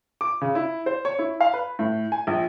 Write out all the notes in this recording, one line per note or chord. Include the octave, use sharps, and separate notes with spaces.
D6
C#3
E4
C5
C#5
E4
F5
B4
A2
G#5
A#1